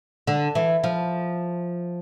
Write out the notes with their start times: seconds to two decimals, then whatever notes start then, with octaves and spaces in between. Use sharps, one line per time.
0.27 D3
0.55 E3
0.84 F3